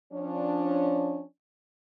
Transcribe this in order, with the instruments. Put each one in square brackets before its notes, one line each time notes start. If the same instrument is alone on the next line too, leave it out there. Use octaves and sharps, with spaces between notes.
[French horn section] F3 C#4 D4